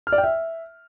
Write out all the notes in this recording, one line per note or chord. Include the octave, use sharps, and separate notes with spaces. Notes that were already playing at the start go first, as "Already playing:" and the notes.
F6
D5
G5
E5